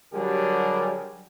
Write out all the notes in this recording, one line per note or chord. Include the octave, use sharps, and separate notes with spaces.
D3 F#3 G3 G4 G#4 A#4